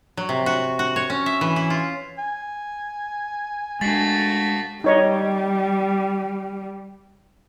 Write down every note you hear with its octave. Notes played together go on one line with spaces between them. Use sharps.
F#3
C3
F#4
F#4
C#5
C#4
E5
E3
E4
F4
G#5
G#3 A3 D4 F#4 A6 B6 C7
G3 D#4 C#5 D#5